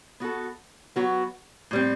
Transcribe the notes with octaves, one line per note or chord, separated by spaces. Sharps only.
B3 F#4 A4
F#3 B3 F#4
A2 G3 C4